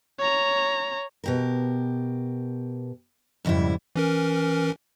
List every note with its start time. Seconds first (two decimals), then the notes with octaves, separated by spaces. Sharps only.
0.19 C#5 A#5
1.24 B2 G4 A#4
3.45 F2 G#2 C#3 G3 E4
3.96 E3 C#4 A#4